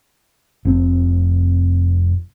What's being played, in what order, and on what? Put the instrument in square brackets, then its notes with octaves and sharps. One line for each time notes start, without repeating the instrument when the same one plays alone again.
[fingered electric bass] F1 C4